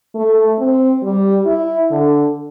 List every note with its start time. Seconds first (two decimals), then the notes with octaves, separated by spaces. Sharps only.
0.15 A3
0.59 C4
1.03 G3
1.46 E4
1.91 D3